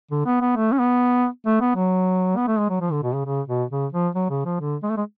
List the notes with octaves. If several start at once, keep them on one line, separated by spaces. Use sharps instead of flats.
D3
B3
B3
A3
C#4
B3
A3
B3
F#3
B3
A3
G#3
F#3
F3
D3
B2
C#3
C#3
B2
C#3
F3
F#3
C#3
F3
D3
G#3
A3
G#3